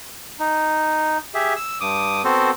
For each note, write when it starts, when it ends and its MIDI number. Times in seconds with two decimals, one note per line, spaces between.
0.39 1.18 63
1.34 1.54 67
1.34 1.54 68
1.34 1.54 76
1.56 1.78 88
1.81 2.22 43
1.81 2.22 86
1.81 2.22 87
2.25 2.51 59
2.25 2.51 60
2.25 2.51 66
2.25 2.51 69
2.25 2.51 72